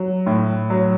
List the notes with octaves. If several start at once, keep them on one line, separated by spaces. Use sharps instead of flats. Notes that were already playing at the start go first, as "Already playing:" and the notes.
Already playing: F#3
A2
F#3